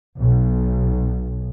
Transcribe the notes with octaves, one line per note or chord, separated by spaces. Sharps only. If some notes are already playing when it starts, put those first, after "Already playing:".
B1